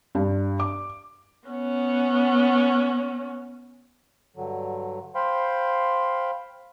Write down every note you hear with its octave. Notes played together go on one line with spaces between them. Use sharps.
G2
D6
B3 C#4
G2 D3 F#3
C5 F5 G5 B5 C6